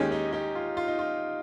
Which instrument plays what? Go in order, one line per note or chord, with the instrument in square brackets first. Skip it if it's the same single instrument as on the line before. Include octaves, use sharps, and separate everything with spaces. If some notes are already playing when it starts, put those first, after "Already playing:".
Already playing: [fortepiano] D#2 D#3 G#3 C#4 G#4 [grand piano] D#4 G4
[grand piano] D#4 G4
D#4 G4
F4
F4
D#4
F4